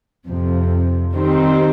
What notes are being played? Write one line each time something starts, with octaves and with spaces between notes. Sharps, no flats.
F2 C3 F3
D#3 G3 C4 D#4